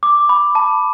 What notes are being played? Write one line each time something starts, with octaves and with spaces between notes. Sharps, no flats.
D6
B5
A5